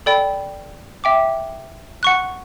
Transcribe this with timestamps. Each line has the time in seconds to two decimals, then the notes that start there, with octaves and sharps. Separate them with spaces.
0.06 A4 D5 G5 B5
1.04 E5 G5 D6
2.03 F#5 C#6 F#6